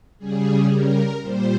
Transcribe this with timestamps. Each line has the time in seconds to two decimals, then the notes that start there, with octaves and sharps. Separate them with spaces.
0.19 C#3 G3 G#4
0.70 A#4
1.21 A#2 G3 C5